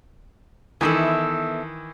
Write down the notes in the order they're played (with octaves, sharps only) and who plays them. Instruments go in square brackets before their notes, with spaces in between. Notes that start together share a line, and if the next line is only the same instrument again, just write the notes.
[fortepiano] D#3 E3 [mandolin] B3 E4 A4